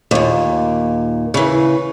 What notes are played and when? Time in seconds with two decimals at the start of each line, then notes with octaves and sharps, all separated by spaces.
0.11 D#2 A#2
1.34 C#3 E3